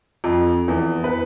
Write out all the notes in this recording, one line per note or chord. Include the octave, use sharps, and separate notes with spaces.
F2
E2
B4